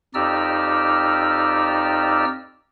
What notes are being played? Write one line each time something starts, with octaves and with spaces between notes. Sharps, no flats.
F2 D#4 G4 D5 E6 F6